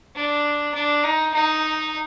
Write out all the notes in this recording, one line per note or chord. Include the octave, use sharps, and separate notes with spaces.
D4
D4
D#4
D#4